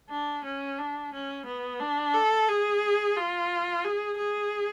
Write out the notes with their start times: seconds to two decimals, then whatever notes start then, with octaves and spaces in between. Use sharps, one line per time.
0.10 D4
0.44 C#4
0.79 D4
1.13 C#4
1.46 B3
1.80 D4
2.14 A4
2.49 G#4
3.17 F4
3.85 G#4
4.18 G#4